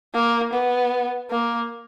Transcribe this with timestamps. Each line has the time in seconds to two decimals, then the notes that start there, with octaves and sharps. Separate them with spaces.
0.14 A#3
0.53 B3
1.30 A#3